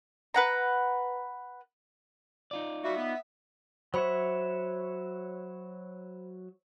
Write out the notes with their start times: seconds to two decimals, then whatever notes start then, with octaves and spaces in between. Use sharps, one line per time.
0.34 B4 F#5 A#5
2.51 D#4 F4 D5
2.84 G3 A#3 F#4 E5
2.96 B3
3.94 F#3 C5 C#5 E5 B5